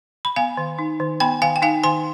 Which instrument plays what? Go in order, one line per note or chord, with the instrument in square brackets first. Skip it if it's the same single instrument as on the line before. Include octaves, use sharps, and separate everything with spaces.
[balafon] B5
B3 F5 G#5
D#3
D#4
D#3
B3 G5 B5
D#3 F5 G#5
G5
D#4 F5 G#5
D#3 G#5 C6